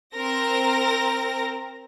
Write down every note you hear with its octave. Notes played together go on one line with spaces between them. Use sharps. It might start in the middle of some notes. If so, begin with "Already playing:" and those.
C4 A#4 A#6